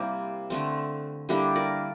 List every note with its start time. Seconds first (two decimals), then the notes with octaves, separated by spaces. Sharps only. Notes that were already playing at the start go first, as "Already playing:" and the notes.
Already playing: C3 G3 A#3 E4 G4
0.50 D3 A3 C4
1.29 D3 G3 A#3 D4 E4 G4
1.56 A#4 D5